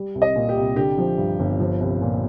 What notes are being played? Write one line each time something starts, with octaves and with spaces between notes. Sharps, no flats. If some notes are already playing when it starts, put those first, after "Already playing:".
Already playing: G3
C2
D#5
A#2
G4
C2
D3 G4
F3
G2
G1
F3
C2
A#2